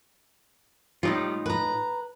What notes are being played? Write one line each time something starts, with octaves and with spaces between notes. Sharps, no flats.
A2 G3 D#4 F4
B4 A#5